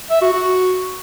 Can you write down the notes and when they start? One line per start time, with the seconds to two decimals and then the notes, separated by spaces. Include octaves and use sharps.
0.10 E5
0.22 F#4
0.33 F#4